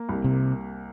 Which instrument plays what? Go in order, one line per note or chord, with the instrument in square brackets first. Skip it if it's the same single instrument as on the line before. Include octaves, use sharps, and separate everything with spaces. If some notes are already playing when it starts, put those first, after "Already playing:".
Already playing: [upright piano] A#3
C2
[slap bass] C3